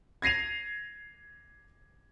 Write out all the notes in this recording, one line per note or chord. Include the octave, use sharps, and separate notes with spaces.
G#6 A#6 C7 D#7 F7